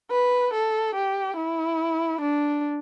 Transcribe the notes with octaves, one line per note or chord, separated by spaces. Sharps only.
B4
A4
G4
E4
D4